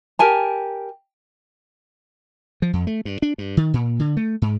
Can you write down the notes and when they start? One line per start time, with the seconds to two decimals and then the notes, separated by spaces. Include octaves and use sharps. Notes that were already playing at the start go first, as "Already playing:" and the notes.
0.19 G4 A#4 G#5 A5
2.62 F3
2.73 F2
2.87 A3
3.05 G2
3.22 D4
3.38 G2
3.57 D#3
3.74 A#2
4.00 D3
4.17 A3
4.42 G#2